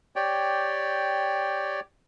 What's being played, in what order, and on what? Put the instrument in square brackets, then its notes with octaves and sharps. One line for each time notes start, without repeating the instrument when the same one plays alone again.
[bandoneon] G4 C#5 D5 G5